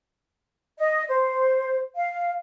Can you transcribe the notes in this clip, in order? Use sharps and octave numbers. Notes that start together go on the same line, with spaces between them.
D#5
C5
F5